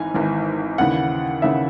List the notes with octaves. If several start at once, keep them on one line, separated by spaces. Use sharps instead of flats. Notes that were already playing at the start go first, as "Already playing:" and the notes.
Already playing: G#1 G#2 E3 G#5
G#1 G#2 E3
D#2 C#3 E3 F#5
D#2 C#3 E3 E5